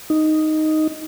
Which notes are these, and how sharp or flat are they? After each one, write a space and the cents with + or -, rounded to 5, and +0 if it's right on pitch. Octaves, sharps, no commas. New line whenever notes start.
D#4 +0